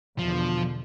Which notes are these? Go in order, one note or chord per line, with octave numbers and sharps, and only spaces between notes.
E2 B2 D3 F3